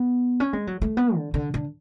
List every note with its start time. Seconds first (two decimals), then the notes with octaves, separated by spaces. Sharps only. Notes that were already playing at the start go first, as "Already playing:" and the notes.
Already playing: B3
0.40 C#4
0.53 G#3
0.67 F#3
0.82 A3
0.97 B3
1.16 D3
1.34 D3
1.54 D3